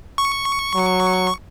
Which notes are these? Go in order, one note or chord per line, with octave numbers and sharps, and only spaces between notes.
C#6
F#3